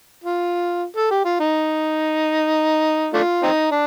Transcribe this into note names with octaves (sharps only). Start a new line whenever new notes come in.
F4
A4
G4
F4
D#4
A3 D4 F4
C4 D#4
D4